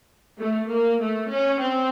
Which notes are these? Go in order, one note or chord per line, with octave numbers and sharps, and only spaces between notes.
A3
A#3
A3
C#4
C4